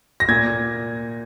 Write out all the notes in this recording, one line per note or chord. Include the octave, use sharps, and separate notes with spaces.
A#6
A#2 G#6